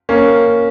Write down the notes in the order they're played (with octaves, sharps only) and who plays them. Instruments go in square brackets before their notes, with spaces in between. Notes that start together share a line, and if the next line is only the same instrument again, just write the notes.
[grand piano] A#3 C#4